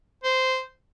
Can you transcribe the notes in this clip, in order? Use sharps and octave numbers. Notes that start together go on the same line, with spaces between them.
C5